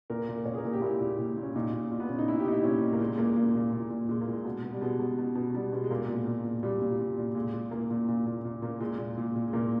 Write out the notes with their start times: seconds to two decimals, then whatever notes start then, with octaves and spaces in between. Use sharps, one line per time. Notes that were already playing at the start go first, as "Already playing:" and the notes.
0.10 A#2 A#4
0.29 A#2
0.46 A#2 C#5
0.54 G#4
0.58 A#4
0.65 A#2
0.73 G4
0.82 A#2 E4
1.01 A#2
1.19 A#2
1.37 A#2
1.43 C#4
1.55 A#2 D#4
1.73 A#2
1.92 A#2
2.00 B3
2.09 A#2 C#4
2.19 D#4
2.28 A#2 E4
2.40 G4
2.46 A#2 D#4
2.52 E4
2.63 A#2 C#4
2.82 A#2
2.93 A#3
3.00 A#2 G#3
3.18 A#2 A#3
3.29 G#3
3.36 A#2 A#3
3.55 A#2
3.73 A#2
3.90 A#2
4.09 A#2 G#3
4.21 A#3
4.28 A#2
4.33 G#3
4.45 B2
4.63 B2
4.73 G3
4.81 B2 G#3
4.99 B2
5.18 B2
5.35 B2
5.54 B2 G3
5.72 B2 G#3
5.84 G#3
5.91 A#2 A#3
6.09 A#2
6.27 A#2
6.45 A#2
6.63 A#2 G3
6.81 A#2
6.99 A#2
7.18 A#2
7.35 A#2 G#3
7.54 A#2
7.71 A#2 A#3
7.90 A#2
8.08 A#2
8.26 A#2
8.45 A#2
8.62 A#2 A#3
8.80 A#2 G#3
8.98 A#2
9.18 A#2
9.36 A#2
9.48 G#3
9.53 A#2 A#3